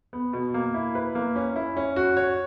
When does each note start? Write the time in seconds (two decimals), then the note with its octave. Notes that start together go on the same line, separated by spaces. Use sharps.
0.13 B3
0.33 B2
0.54 A#3
0.74 E4
0.95 B4
1.15 A#3
1.36 C#4
1.56 E4
1.77 C#4
1.96 F#4
2.17 C#5